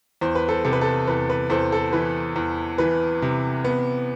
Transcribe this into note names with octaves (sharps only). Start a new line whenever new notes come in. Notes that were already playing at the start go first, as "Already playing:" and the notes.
E2 C5
B4
A4 C5
C3 A4
B4
A4
E2 B4
B4
E2 A4 C5
A4
E3 B4
E2
E3 B4
C3
B3